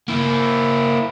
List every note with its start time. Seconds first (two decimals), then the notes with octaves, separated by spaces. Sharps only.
0.08 A#3 E4